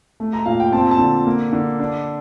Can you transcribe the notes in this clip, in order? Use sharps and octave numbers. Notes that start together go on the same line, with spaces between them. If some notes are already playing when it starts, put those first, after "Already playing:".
A3
A#5
A#2 F5
G5
C4 A5
A5
D3
A#3
D3
D4